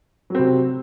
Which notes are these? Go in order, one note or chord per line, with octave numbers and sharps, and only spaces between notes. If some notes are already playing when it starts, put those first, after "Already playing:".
C3 F#3 C4